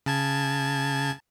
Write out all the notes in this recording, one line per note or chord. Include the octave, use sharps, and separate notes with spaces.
C#3 A5 G#6